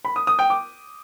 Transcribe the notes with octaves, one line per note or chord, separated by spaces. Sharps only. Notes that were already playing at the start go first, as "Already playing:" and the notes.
B5
D#6
D#6
G5
D6